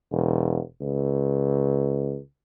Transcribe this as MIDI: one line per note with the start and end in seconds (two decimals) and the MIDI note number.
0.11 0.59 28
0.81 2.18 37